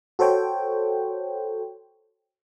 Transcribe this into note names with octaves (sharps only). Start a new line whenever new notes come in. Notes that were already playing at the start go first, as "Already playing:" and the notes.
F#4 A4 C5 C#5 G5